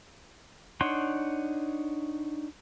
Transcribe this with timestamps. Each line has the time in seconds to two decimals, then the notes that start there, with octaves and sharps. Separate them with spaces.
0.81 D4 D#4 C#5 F#5 C6